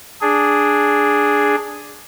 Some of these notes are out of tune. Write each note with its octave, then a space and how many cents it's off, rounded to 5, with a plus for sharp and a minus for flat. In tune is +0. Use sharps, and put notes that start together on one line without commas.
D4 +0 G#4 +0